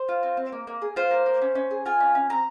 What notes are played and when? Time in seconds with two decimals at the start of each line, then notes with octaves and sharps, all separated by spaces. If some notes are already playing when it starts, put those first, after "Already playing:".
Already playing: C5
0.09 F4
0.23 C4
0.37 C4
0.52 A#3
0.67 A#3
0.82 G#4
0.96 F4 C5
1.11 A#3
1.26 A#3
1.42 C#4
1.55 C#4
1.71 G#4
1.86 F4 G#5
2.00 C#4
2.15 C#4
2.30 C4 A#5